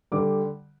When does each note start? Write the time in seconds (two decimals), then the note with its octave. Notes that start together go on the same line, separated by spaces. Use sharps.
0.12 D3 G3 D6